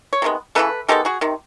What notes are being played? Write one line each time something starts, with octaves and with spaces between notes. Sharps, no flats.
C#5
C3 D#3 G#3 B3
C#3 E3 A3 A4 B4
D#3 G#3 B3 G4 A4
F#4 G#4
C3 D#3